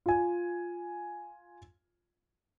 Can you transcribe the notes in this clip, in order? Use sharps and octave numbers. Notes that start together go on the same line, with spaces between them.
F4 G#5